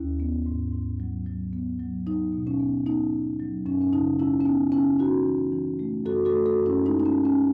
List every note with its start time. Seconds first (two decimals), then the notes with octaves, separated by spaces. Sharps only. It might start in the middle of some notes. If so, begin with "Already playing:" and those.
Already playing: D#2 C#4 E4
0.20 B3
0.46 G#2
0.73 G#2
1.00 F#3
1.26 F#3
1.53 B3
1.80 F#3
2.06 F#3 D#4
2.32 B2
2.47 C#4
2.60 B3
2.86 B3 D#4
3.13 B3
3.39 F#3
3.66 F#2 C#4
3.81 C#4
3.93 C#3 D#4
4.19 G#3 C#4 E4
4.41 C#4
4.45 B3 D#4
4.72 C#3 C#4 E4
4.99 G#3 D#4 F#4
5.25 E3
5.52 E3
5.79 A3
6.05 F#2 F#4 A4
6.25 F#4 A4
6.32 A3
6.46 F#4 A4
6.59 F#2
6.66 C#4 E4
6.86 G#3 D#4
7.00 D#4
7.05 C#4
7.13 G#3
7.25 C#4